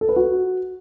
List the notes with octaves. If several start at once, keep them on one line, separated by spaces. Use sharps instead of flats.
A4
B4
F#4